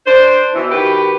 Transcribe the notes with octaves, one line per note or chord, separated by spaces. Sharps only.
D4 C5
B2 E3
D#3 F#4 G4 B4